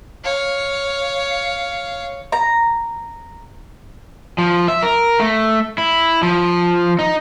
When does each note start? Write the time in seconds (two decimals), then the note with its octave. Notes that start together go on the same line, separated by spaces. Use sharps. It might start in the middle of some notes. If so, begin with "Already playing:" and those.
0.24 C#5 F5
2.32 A#5
4.38 F3
4.68 E5
4.83 A#4
5.20 A3
5.78 E4
6.23 F3
6.99 D#4